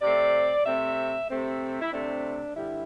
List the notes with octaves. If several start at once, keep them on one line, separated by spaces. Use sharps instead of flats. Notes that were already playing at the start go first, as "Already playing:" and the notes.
C3 A3 C4 D5
C3 A3 C4 E5
C3 A3 C4
E4
C3 A3 C4 D4
G2 D3 G3 E4